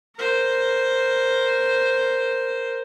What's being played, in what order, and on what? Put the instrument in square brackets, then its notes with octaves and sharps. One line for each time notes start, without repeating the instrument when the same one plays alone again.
[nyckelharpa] A#4 C5